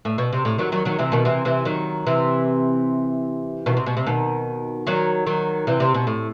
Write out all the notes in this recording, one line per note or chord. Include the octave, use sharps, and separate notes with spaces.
A2
B2
C3
A2
D#3 F#3
D#3 F#3
D#3 F#3
C3 E3
B2 D#3
C3 E3
C3 E3
D#3 F#3
C3 E3
B2 D#3
C3
B2
C3
B2 D#3
D#3 F#3
D#3 F#3
C3 E3
C3
B2
A2